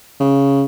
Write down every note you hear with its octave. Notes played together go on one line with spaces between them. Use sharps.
C#3